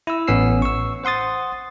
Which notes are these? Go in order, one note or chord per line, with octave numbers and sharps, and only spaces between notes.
E4 E6
A1 B3 C#4 E6 C7
C#6 E6
C5 F#5 C6 D#6 A6